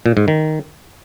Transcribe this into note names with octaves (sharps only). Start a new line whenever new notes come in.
A#2
G#2
D#3